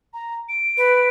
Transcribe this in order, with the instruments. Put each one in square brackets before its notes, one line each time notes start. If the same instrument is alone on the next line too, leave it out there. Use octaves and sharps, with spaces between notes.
[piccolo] A#5
D7
[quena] B4